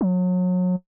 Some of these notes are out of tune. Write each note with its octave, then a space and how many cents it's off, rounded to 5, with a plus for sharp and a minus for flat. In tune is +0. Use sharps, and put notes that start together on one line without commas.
F#3 -30